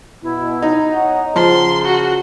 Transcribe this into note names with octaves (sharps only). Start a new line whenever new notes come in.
B2 E4
D#4 A#5
C#5 D#5 F#5
C#3 F3 G#4 C6
F#4